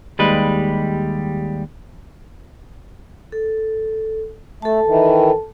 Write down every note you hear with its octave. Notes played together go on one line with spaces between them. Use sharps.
D#2 G3 G#3 B4
A4
A3 A4 A5
D#3 E3